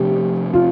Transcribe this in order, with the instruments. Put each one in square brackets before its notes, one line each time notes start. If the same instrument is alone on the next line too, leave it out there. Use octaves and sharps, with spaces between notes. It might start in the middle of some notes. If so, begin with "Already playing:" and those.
Already playing: [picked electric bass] C3 F3 A3 D4 [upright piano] G4
[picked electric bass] C3 F3 [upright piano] F4